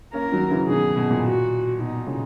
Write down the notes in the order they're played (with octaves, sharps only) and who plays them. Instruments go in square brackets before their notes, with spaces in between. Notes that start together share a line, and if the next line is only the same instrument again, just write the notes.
[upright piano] A#3 C#4 [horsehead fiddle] A#4
[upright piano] D#3 F#3
C#3 E3
[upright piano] B2 D#3 [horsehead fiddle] G#4
[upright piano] B2
A#2
[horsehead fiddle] F#4
[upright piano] B2 [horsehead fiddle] D#4
[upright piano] A#2 C#3